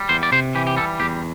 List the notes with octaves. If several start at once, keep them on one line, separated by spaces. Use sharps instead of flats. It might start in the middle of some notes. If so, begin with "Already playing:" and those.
Already playing: G3
E2 C5
D5
C3 C5
E3 G4
G4
G3 A4
E2 G4